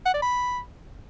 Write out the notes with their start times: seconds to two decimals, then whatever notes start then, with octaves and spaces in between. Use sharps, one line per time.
0.06 F#5
0.14 D5
0.22 B5